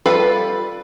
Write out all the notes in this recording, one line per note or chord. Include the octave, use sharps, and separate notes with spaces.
G3 F4 A4 B4 F5